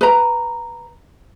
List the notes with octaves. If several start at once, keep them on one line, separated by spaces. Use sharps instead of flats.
B4 A#5